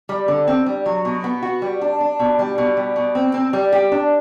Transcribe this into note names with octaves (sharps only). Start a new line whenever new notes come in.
G3
D3
C4
G3
F#3
B2
B3
F#4
G3
D4
D4
B2
G3
B2
G3
B2
C4
C4
G3
G4
D4